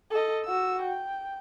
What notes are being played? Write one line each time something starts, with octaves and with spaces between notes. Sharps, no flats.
A4 D#5
F#4 E6
G5